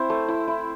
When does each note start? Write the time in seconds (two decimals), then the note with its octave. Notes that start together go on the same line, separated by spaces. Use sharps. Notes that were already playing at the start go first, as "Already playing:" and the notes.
Already playing: C4 E4 C5
0.10 A3
0.28 E4
0.47 E4